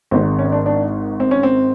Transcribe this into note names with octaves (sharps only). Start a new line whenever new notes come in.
G#1 G#2 D#3 C4
C#4
D4
D4
C4
C#4
C4